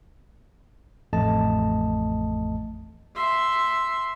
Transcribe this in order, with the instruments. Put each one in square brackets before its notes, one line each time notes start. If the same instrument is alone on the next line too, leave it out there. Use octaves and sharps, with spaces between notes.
[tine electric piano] A1 F2 A3 D#5 A5
[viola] E5 C6